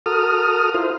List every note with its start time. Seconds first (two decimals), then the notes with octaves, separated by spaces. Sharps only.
0.06 F#4 A4 A#4 D#6 F6
0.74 E4 F4 C5